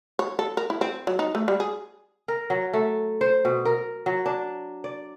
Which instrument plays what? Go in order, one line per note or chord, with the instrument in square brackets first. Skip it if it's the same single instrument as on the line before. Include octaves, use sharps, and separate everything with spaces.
[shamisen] C#5
A4
A#4
E4
C4
F#3
D#4
A3
G3
G#4
[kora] A#4
F#3
A3
C5
B2
A#4
F#3
D4
D5